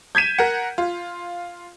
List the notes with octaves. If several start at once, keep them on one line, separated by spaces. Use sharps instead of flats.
G6 G#6 B6 D#7 E7
A#4 F#5
F4